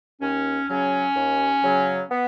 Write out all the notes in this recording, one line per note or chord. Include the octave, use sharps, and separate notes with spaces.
D#2 C#4
C#3 F#3 C#4
D#2
C#3 F#3
B3